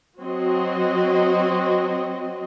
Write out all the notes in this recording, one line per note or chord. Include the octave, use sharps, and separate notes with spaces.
F#3 C4 F#4 D#5